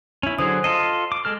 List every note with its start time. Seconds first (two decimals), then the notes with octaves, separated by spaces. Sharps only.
0.23 C#4 E4
0.39 D3 F#3 G#4 C5 D#6
0.64 F4 A4 D#5 C7
1.12 D6
1.25 G#3 A4 F6